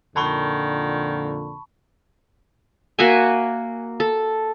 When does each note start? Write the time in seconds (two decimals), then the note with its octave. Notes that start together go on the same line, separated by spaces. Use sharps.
0.16 F2 A#2 D3 D#3 A5 B5 C#6
2.99 A#3 F#4 E5 G#5
4.00 A4